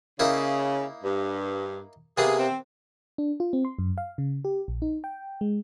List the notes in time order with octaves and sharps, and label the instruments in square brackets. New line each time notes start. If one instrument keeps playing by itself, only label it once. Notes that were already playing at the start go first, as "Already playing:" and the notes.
[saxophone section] C#3 [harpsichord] A#3 D#4 E4
[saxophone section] G2
[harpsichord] C3 A#3 B3 [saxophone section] G#4
[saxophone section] C4
[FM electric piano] D4
F4
C4
C6
F#2
F5
C#3
G4
A#1
D#4
G5
G#3